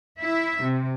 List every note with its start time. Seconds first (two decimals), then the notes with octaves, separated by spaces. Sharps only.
0.20 E4 E5
0.60 C3